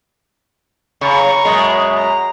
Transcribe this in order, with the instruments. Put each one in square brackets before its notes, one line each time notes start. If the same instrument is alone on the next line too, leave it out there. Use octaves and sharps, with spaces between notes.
[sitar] C#3 [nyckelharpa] A#5 C#6
[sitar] F#2 B2 G#3
[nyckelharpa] A#5